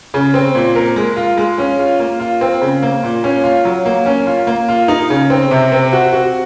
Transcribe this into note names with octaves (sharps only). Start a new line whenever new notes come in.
C#3
C4
A#2
A#4
G#3
F4
G#3
C#4
F4
A#3
F4
C4
C#3
A#3
A#2
C#4
F4
F#3
A#3
C#4
F4
A#3
F4
D#4
C#3
C4
C3
C4
F#4
F#4